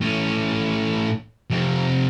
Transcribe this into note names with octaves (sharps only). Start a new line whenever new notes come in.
A2 C#4
F2 C3